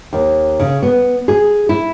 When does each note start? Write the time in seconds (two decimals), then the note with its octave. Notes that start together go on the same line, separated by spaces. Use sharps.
0.13 D#2
0.60 C#3
0.83 B3
1.28 G#4
1.69 E4